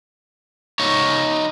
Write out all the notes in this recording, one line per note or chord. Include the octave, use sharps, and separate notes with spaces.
D#4 C#5